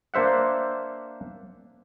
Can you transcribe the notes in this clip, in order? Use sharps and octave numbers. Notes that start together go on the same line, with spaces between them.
A#3 D4 C5 E5 F#5